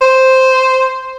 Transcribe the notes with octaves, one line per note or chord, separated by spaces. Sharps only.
C5